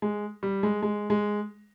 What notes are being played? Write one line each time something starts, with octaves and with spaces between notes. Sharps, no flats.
G#3
G3
G#3
G#3
G#3